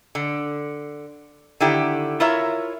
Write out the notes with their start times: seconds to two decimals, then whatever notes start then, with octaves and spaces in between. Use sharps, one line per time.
0.15 D3
1.60 D3 D#3 E4 G4
2.20 E4 F4 A#4 C#5 E5